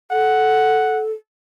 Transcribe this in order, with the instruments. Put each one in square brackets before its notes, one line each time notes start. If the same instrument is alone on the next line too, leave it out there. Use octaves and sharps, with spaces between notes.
[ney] A4 [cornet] F#5